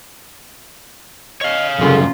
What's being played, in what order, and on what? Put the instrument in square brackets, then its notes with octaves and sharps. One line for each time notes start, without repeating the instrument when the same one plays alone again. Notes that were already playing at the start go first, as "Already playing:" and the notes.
[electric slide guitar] C#5 F5 [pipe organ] D#5
[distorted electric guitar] C2 F#2 [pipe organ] C#3 G#4 A4 [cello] C#4 F4